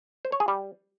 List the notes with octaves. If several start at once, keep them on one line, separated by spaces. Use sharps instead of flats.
C5
C#5
G#4
G3